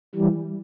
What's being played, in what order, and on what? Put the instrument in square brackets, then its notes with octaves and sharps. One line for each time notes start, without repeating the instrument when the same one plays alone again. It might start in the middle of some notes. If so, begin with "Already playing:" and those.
[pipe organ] E3 G3